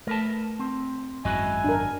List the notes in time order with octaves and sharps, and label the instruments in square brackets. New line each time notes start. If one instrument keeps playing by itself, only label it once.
[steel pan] A3 [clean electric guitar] A#4 B4 A5
[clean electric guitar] C4
[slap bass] G#1 F#2 G#3 [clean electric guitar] E4 F#4 D#5 [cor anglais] G#5
[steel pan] D4 A#4